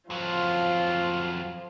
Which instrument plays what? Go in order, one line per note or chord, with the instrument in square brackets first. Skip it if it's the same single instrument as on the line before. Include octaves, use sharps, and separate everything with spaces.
[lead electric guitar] F2 F#3 [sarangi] F3 [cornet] F4